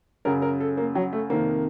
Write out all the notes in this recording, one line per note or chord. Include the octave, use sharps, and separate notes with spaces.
F#2 C#3 A#4
A#4
A4
A#3
F#3
A3
F2 C3 D#3 A#3